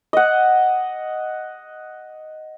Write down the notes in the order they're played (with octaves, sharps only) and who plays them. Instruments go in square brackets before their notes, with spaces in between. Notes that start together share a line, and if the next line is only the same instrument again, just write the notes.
[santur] D#5 F#5